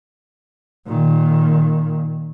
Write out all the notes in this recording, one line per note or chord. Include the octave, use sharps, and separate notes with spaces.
A#2 D#3